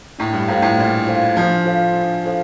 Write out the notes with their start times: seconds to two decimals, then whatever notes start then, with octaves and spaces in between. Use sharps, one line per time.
0.19 A2 D4
0.34 G2
0.48 A2 F4 A4 C5 F5
0.62 A2
0.78 A#2 D4
1.07 F4 A4 C5 F5
1.36 F3 D4
1.65 F4 A4 C5 F5
1.94 D4
2.24 F4 A4 C5 F5